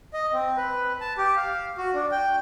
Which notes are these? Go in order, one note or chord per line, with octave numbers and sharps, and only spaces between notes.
D#5
C4
B4
A5
G4
F5
F#4
D4
G5